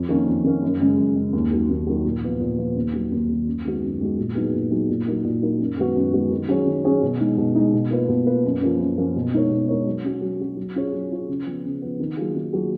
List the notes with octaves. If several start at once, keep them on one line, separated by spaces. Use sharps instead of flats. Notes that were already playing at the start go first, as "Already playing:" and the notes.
Already playing: F2
D#3 A#3 C#4
F2
D#3 A#3 C#4
F#2
C#3 G#3
F#2
C#3 G#3
D#2
D#3 F#3
D#2
D#3 F#3
A#2
F3 B3 F4
A#2
F3 B3 F4
D#2
D#3 F#3
D#2
D#3 F#3
F#2
D#3 G#3 B3 F#4
F#2
D#3 G#3 B3 F#4
A#2
F#3 B3 D#4 G#4
A#2
F#3 B3 D#4 G#4
A#2
F#3 A#3 D#4 A#4
A#2
F#3 A#3 D#4 A#4
F#2
D#3 G#3 B3 F#4
F#2
D#3 G#3 B3 F#4
D#3
F#3 C#4 G#4 C#5
D#3
F#3 C#4 G#4 C#5
B2
G#3 D#4
B2
G#3 D#4
B2
A#3 F4 B4
B2
A#3 F4 B4
F#2
F3 A#3 C#4
F#2
F3 A#3 C#4
B2
G#3 D#4 A#4 C#5
B2
G#3 D#4 A#4 C#5
F#3
C#4 F#4
F#3
C#4 F#4
F#3
C#4 F4 G#4 C#5
F#3
C#4 F4 G#4 C#5
C#3
F3 B3
C#3
F3 B3
D#3
F#3 A#3 F4 G#4
D#3
F#3 A#3 F4 G#4